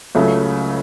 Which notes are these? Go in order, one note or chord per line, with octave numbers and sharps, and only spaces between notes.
C#2 C#3 F#3 A3